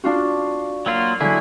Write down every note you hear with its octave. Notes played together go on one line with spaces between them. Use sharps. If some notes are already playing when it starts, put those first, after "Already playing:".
D4 F4 F#4
F#3 A#3 F4
D3 F#3 E4 G#4